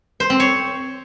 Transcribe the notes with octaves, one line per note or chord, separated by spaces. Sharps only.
C5
C4
C#5